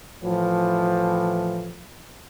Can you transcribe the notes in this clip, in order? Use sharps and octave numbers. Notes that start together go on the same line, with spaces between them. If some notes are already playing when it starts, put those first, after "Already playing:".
A2 E3 F3